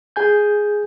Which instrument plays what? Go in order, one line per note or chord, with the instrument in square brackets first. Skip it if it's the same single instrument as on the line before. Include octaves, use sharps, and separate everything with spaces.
[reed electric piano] G#4 G#5 G6